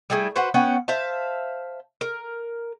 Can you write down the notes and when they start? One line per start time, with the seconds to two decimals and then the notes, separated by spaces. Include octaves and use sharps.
0.10 G3 A3 E4 G#4
0.36 F#4 B4 C5 F#5
0.54 B3 C#4 F#5 G5
0.88 C5 E5 F5 A5
2.01 A#4